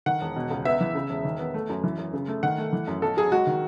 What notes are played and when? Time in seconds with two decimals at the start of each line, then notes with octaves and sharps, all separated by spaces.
0.06 D#3 F#5
0.21 E1
0.36 B2
0.51 C#2
0.65 B3 E5
0.80 E3
0.95 C#3
1.10 E1
1.25 D#3
1.39 B3
1.54 A3
1.69 F#2
1.84 E3
1.98 F#2
2.13 C#3
2.28 A3
2.43 D#3 F#5
2.58 A3
2.73 E3
2.88 F#2
3.02 B1 A4
3.17 F#3 G#4
3.32 G#3 F#4
3.47 D#3